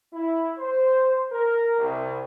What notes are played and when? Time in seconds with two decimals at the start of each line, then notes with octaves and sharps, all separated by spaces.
0.13 E4
0.58 C5
1.32 A#4
1.79 C2